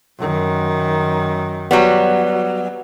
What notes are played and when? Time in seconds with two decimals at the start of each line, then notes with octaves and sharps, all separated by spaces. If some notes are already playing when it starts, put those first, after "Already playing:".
0.18 F#2 D#3
1.71 F#3 G3 B3